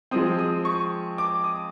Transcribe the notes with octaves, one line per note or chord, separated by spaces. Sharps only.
F3 G#3 C4 D#6
D#6
C#6
D6
D#6